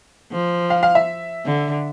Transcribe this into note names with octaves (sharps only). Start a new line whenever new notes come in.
F3
F5
F5
E5
D3